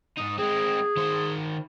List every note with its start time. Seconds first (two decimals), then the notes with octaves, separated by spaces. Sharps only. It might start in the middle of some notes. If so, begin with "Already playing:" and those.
0.18 G#2 D#4 D#6
0.38 G#3 C4 G#4
0.97 D#3 C5